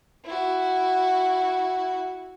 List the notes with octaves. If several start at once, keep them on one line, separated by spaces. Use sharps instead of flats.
E4 F#4